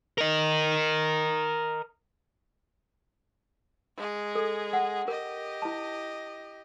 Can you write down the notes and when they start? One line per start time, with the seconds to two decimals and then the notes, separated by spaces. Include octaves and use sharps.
0.18 A#4 D#5
3.97 G#3 G#4
4.35 A4
4.73 F#5
5.08 G4 A#4 D#5
5.62 E4 A5